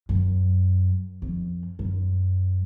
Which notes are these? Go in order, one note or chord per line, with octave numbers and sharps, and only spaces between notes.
F#2
F2
F#2